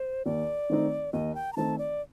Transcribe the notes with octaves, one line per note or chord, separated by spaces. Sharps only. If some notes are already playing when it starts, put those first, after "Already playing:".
Already playing: C5
D#2 D5
D#3 A3 C4 D#4
D#2 D#5
G5
A#5
D#3 A3 C4 D#4 A5
D5